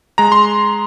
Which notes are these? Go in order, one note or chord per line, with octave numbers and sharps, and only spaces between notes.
G#3 A#5
C6